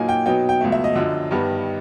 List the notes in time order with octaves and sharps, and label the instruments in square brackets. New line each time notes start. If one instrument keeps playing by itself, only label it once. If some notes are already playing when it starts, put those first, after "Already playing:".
Already playing: [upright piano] A#2 F#3 A#3 D#4 G#5
G5
B2 F#3 B3 D#4 G5
G5
C#2 B2 F#3 A3
E5
D#5
F#2 D3 F3
G2 D#3 G3 B3